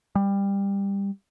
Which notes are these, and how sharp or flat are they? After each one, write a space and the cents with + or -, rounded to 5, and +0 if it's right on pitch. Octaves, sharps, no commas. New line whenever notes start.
G3 +20